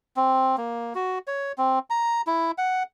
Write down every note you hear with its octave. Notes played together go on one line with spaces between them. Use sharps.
C4
A#3
F#4
C#5
C4
A#5
E4
F#5